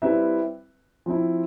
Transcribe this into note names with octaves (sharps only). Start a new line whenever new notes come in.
G3 C4 E4 B4 E5
F3 C4 E4